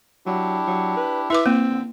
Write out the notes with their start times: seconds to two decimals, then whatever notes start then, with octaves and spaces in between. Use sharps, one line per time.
0.26 F#3 D4 E4 G4
0.67 F#3
0.97 B4
1.30 E4 B4 E5 D6
1.46 A#3 C4
1.69 D3